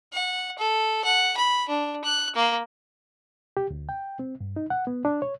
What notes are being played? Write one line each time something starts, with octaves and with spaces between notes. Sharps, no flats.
F#5
A4
F#5
B5
D4
F#6
A#3
G4
D2
G5
C4
G2
D#4
F#5
B3
D4
C#5